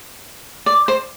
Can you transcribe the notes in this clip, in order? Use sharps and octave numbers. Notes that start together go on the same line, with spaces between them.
D5
C5